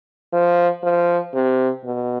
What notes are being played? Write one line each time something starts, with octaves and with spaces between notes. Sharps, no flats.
F3
F3
C3
B2